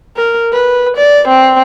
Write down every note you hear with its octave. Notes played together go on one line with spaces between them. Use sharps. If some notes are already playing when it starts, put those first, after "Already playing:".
A#4
B4
D5
C4